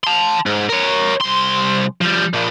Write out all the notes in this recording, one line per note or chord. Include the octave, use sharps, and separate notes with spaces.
A5 C6
G#2
A#4 C#5
C2 C6
F3 G3
A#2 F3